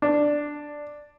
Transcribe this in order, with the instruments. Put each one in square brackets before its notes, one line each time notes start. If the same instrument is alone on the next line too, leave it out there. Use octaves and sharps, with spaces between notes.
[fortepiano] D4